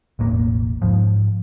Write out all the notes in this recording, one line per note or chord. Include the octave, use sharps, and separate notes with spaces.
E1 A1 A#3
G#2 F3